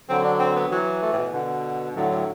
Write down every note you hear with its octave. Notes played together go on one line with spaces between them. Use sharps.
D3 F#3 C4
D4
C4
B3
E3 F#3
A3
A2
B2
B2 D3
A2 D3 F#3
A2